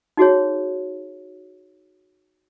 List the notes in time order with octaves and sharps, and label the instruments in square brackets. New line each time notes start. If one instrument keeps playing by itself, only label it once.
[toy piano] D#4 F#4 G#4 C#5